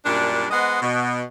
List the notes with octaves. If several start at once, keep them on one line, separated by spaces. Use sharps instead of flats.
F#2 A#2 G3 D4
G#3 B3 C5 D#5 F#5
B2